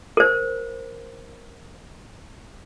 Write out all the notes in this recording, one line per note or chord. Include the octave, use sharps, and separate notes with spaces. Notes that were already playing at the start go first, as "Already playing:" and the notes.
A#4 C5